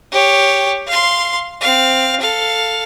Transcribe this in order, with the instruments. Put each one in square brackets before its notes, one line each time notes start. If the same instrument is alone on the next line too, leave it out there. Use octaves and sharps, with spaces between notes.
[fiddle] G4 C#5
F5 C6
C4 F5
A4 F5